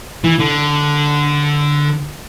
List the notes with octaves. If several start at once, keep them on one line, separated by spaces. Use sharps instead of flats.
E3
D3